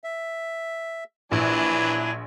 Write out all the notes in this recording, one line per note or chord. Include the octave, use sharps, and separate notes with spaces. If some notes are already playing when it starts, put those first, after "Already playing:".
E5
A#1 E3 F#3 D4 E4 G#5